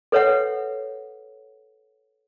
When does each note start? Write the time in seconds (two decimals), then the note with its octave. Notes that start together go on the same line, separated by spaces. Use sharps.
0.12 A4 B4 C#5 E5 F#5